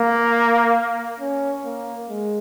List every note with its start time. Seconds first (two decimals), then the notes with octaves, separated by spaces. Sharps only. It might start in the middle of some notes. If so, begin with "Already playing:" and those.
Already playing: A#3
1.20 C#4
1.64 A#3
2.09 G#3